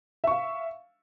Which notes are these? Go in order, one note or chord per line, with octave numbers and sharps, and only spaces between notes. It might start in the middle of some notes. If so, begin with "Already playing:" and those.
E5 F5 C#6